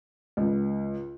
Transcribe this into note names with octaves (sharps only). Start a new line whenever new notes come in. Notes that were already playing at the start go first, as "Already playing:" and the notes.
C#2